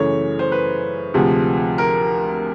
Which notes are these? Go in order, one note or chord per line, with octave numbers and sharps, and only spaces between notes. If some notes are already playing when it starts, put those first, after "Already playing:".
Already playing: F#2 C#3 E3 A3 C#5
C5
B4
D2 C3 F3 G#3
A#4